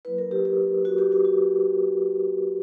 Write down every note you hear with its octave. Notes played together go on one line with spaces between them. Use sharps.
F#3 A#3 E4 B4
A#4
G4
G4
F#4
G4
F#4
F#4